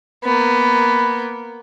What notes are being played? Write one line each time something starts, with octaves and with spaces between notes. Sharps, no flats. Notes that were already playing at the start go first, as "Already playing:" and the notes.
A#3 B3